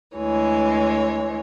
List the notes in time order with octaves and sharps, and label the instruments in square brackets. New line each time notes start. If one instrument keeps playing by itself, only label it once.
[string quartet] D2 E3 G#3 C#5